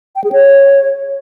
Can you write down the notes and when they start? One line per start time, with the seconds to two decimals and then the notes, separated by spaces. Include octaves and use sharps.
0.16 G5
0.24 G#4
0.32 C#5